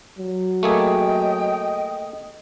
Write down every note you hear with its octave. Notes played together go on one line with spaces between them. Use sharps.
F#3
A3 A#3 G#4 D#5 G5